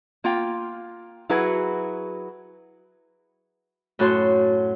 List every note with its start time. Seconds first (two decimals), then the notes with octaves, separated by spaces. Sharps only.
0.24 A#3 F4 G5
1.29 F#3 E4 F#4 G#4 B4
3.99 F#2 A2 F#4 C#5 A5 C6